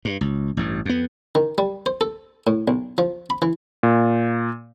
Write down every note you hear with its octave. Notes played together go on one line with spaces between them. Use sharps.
G2
C#2
A1 G2
F2 B3
D#3
G3
C5
A4
A2
B1
F3
B5
E3
A#2